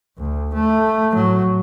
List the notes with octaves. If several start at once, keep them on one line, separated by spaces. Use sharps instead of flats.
D2
A3
A2 F#3